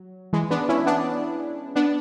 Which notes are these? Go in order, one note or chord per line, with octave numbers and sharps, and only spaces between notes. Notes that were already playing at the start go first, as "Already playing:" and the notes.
Already playing: F#3
E3 G#3
B3 D4
C#4 E4
B3 D4
B3 D4